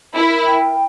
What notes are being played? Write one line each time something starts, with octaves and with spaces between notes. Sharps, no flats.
E4 A#4
G5